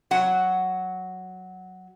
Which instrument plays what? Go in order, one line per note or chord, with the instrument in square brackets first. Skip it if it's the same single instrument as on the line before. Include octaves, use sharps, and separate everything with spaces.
[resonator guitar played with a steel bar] F#3 F#5